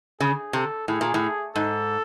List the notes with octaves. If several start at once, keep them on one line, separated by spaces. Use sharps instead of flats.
C#3 G#4
C3 A4
A2 G#4
A#2
A2
G#2 A4